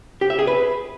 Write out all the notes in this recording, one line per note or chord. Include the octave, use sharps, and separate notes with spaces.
G4
E5
G#4
B4